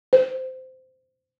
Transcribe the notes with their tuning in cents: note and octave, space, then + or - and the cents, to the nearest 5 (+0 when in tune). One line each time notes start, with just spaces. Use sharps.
C5 -15